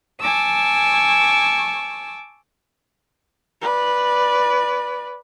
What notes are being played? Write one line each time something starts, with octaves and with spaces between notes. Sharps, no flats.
G#5 A5 C#6 D6 E6
B4 D5